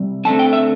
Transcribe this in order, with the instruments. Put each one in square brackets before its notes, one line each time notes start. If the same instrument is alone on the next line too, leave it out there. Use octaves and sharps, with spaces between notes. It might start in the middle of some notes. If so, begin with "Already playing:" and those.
Already playing: [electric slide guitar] C3 G3
D3 A3 C4 A5
G5
E5